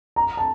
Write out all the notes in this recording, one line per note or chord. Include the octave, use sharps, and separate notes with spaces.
A#5
A5